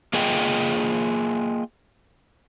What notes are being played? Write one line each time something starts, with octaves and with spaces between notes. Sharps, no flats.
A#3 F4 G#4 D#5 G5